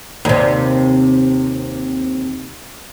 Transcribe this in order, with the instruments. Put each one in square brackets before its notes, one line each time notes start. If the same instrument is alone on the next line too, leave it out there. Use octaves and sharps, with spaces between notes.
[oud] D#2 C3